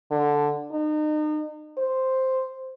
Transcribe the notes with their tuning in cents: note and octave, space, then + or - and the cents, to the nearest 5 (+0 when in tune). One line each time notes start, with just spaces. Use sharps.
D3 +0
D#4 -35
C5 +0